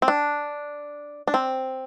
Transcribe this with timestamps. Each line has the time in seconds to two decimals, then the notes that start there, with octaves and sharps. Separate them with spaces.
0.02 C4
0.08 D4
1.27 D4
1.34 C4